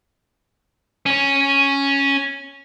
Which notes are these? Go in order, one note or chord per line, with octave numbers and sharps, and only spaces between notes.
C#4 C#5